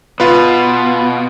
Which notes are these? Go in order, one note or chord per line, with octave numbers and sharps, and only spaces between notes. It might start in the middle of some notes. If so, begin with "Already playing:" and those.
B2 F4 B4